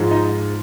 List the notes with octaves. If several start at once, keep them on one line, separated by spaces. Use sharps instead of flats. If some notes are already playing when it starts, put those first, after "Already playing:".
Already playing: G#2 F3 G#3
D#4